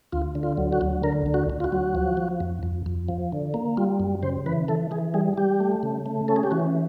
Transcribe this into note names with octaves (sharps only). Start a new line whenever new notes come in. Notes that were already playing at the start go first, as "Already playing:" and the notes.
D2 F4
D3
F4
F#3
F#4
D2
D3 A#4
D2
F#4
D2
F4
F#4
F#3
F3
F3
F2
F2
F2
F3
D3
A#3
G3 F4
F#2
C#3 C5
E3 B4
E3 A4
E3 G#4
G3 G#4
G3 G4
A3
C#3
A3
C#4 A4
G#4
G4
E3 F#4